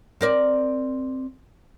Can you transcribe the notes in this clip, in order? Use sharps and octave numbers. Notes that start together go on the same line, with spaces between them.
C4 A#4 D5